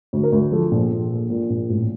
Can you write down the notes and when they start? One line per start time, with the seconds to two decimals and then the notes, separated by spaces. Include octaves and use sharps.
0.13 D2
0.23 A#4
0.32 D2
0.52 F3 A4
0.71 A#1
0.91 A#1
1.11 A#2
1.30 A#2
1.50 A#1
1.69 A1